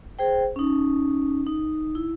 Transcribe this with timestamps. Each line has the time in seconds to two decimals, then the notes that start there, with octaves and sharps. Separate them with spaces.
0.19 G#4 C5 G5
0.56 C#4 D#4
1.47 D#4
1.95 E4